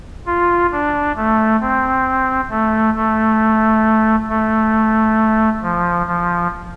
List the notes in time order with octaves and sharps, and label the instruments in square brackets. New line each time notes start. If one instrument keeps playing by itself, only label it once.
[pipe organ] F4
D4
A3
C4
A3
A3
A3
F3
F3